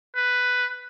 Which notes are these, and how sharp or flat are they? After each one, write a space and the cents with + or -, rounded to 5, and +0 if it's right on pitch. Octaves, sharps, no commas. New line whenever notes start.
B4 +5